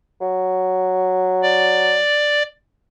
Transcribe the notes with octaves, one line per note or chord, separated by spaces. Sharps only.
F#3
D5